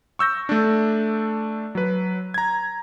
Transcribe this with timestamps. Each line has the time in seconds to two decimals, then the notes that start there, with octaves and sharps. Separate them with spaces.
0.19 C#6 E6 G6 A#6
0.49 A3 D4
1.75 F#3 B4
2.34 A#5 G#6